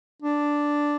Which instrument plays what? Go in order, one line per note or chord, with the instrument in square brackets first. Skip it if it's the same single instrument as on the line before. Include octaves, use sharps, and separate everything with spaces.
[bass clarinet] D4